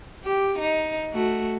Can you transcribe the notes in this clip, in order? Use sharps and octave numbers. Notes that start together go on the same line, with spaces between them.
G4
D#4
A3 F#4